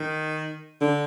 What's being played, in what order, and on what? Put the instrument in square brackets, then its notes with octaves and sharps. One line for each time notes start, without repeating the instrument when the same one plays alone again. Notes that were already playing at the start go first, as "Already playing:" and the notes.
Already playing: [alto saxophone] D#3
D3